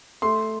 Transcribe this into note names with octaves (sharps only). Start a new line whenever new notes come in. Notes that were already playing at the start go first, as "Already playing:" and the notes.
A3 C6